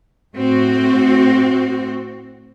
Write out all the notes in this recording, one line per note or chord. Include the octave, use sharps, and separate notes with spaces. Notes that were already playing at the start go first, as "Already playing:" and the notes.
A2 C4 F#4